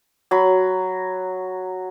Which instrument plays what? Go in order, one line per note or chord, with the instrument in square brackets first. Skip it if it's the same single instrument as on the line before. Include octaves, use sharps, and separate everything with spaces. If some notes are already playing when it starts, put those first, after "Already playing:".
[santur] F#3 B5